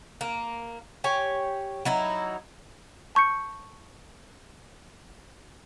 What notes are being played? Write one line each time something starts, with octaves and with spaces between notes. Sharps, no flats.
A#3
G4 C#5 G#5
F#3 D#4 E4
A5 C#6 G6 C#7